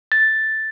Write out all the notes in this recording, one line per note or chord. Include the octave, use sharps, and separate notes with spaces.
A6